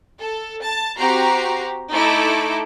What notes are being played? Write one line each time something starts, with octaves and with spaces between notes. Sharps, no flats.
A4
A5
C4 F#4 G4 A#5 C7
A3 D#4 E4 A4 E5 D6